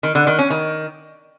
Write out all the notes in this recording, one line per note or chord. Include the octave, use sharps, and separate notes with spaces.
D#3
D3
D#3
C#4
D#3